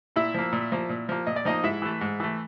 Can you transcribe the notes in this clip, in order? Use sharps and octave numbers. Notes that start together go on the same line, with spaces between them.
A#2 E4 E5
F3 A#3
A#2
F3 A#3
A#2
F3 A#3
A#2 D#5
D5
F3 A#3 D#4 D#5
G#2 E4 E5
E3 A3
G#2
E3 A3